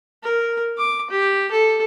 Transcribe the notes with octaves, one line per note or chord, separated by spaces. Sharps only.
A#4
D6
G4
A4